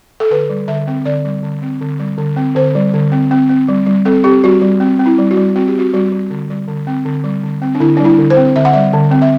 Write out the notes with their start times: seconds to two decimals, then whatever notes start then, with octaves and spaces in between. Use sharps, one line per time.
0.20 A4
0.31 D3 B4
0.49 G3
0.68 D3 E5
0.87 C4
1.05 D3 D5
1.25 G3
1.43 D3
1.62 C4
1.81 D3
2.00 G3
2.18 D3
2.36 C4
2.56 D3 C5
2.75 G3
2.94 D3
3.12 C4
3.31 C4
3.49 C4
3.68 G3
3.86 G3
4.05 C4 A4
4.24 C4 G4
4.44 G3 F#4
4.62 G3
4.80 C4
4.99 C4
5.06 E4
5.19 G3
5.31 F#4
5.37 G3
5.56 C4 F#4
5.67 G4
5.75 C4 F#4
5.93 G3 F#4
6.12 G3
6.30 D3
6.50 G3
6.68 D3
6.87 C4
7.05 D3
7.24 G3
7.44 D3
7.62 C4
7.75 D4
7.80 D3 E4
7.97 G3 D4
8.05 E4
8.18 D3
8.30 C5
8.37 C4
8.56 D3 E5
8.65 F#5
8.73 G3 E5
8.93 D3
9.11 C4
9.22 E5